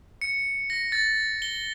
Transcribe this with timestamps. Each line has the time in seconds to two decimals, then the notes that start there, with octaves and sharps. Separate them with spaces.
0.21 C#7
0.70 A#6
0.92 A6
1.42 G7